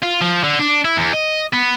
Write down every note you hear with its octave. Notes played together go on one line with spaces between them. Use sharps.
F4
F3
D3
D4
E4
E2
D#5
B3